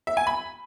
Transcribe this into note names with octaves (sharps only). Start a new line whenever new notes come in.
E5
G#5
B5